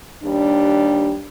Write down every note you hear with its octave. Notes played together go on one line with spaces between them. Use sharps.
D#2 G3 D4